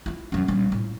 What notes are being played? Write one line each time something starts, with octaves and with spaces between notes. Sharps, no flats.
E4 F4
F#2 C#4
A#1 G3
A2 F4